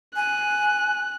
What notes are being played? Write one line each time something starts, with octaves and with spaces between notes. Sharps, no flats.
G#5 F#6